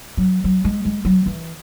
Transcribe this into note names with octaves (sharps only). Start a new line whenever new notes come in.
F#3
F#3
G#3
G#3
F#3
E3